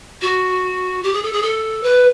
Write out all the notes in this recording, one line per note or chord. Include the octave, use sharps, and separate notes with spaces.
F#4
G4
G#4
A4
G#4
A4
B4